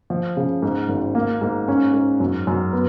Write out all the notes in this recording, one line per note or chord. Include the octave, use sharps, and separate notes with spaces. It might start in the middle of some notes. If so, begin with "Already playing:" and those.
F3
C#3
G#2
G#1
A#3
G#2
C#4
G#2
F#2
F#2
B3